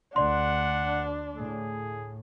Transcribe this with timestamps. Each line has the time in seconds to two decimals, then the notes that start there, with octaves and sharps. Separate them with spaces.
0.16 D2 D4 D5 F#5 C6
1.37 A2 G#4